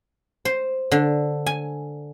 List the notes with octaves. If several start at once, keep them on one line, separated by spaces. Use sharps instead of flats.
C5
D3
G#5